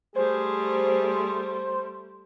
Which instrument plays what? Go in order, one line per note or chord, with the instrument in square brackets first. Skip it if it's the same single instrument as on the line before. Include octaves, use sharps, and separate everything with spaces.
[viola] G3 A3 [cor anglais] G#4 [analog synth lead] C5